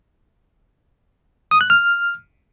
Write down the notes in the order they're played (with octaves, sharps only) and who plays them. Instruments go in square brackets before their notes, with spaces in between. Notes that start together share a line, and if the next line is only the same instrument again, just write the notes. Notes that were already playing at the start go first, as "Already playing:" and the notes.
[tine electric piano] D#6
F#6
F6